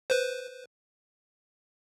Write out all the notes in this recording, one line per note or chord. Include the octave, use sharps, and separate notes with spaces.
B4 C5